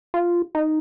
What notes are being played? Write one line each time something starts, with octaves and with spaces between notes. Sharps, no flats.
F4
D#4